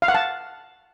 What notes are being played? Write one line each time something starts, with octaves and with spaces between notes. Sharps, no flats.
F5
F#5
A5